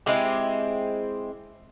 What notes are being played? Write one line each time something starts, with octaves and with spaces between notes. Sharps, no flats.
G#3 C4 E4 G4